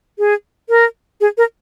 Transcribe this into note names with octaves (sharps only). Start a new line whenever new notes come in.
G#4
A#4
G#4
A#4